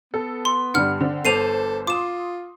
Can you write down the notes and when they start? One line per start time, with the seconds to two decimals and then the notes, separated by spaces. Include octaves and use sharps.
0.14 B3 A4
0.45 C6
0.74 G2 D3 G3 F#5 F6
1.01 D3 C4 D4
1.25 G1 A4 C5 D6 C7 D#7 F7
1.87 F4 C6 D6 D#6 E7